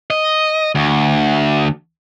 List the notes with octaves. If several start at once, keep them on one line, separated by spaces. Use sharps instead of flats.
D#5
D2